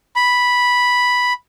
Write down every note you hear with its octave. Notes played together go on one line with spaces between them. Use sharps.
B5